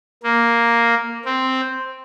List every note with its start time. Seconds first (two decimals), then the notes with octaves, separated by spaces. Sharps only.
0.23 A#3
1.25 C4